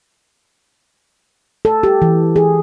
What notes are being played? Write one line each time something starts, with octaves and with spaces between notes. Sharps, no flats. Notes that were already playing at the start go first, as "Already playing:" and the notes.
A4
G4
E3
G#4